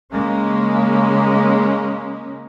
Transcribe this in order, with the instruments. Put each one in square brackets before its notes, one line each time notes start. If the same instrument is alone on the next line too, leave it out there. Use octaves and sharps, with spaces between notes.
[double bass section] C#3 G#3 A#3 C#4